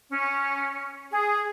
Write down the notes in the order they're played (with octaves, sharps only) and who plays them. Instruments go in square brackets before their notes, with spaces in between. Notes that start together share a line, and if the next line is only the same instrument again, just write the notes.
[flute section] C#4
G#4